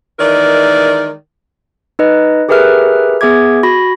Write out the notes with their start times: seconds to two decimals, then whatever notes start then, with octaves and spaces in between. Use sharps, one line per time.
0.19 D#3 E3 G#3 A#4 D5
1.99 D#4 B4 D#5
2.49 G4 G#4 A#4 B4 E5 F6
3.21 B3 G#4 E5 D6 G#6
3.63 F#4 B5 A#6